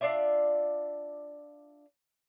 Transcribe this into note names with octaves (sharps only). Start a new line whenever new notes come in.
D4 F4 D5 E5